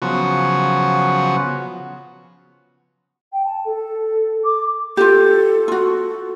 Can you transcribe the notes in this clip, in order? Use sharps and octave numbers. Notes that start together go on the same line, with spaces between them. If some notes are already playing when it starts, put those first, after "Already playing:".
C#3 F3 F#3 B3 F#4
G5
A5
A4
D6
F4 G4 A4
F4 F#4